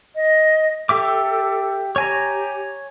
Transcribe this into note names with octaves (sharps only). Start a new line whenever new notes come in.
D#5
G4 A4 E5 D6
G4 C#5 G#5 A#5